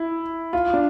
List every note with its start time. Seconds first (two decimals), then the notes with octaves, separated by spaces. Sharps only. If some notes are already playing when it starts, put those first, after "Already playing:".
Already playing: E4
0.53 F4
0.74 D4